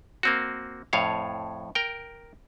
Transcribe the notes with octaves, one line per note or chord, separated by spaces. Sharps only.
A#3 C4 F#4
F2 A2 C#5 F5
A#4 G5